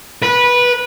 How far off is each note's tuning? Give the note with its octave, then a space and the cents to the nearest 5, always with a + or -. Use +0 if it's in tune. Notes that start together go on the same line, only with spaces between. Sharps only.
B4 -15